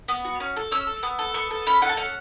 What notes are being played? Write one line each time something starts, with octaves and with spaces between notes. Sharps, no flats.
B3
F#4
C#4
A4
C#4 E6
A4
B3
A4
B3 C#6
A4
C#4 B5
A4 F#5
A5
C#4 F#5